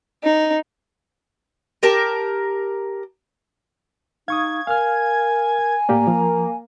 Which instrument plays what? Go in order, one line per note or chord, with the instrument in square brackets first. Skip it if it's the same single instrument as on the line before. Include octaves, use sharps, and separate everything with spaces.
[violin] D#4
[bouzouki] G4 A#4 A5
[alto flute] D#4 [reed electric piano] F5 C#6 D#6 [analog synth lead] G#6
[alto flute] A#4 [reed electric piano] F5 F6 [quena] G#5
[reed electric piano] A2 G4 D5 [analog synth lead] A#3 [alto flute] A#5
[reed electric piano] F3